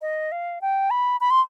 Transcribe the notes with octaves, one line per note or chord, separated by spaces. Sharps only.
D#5
F5
G5
B5
B5
C6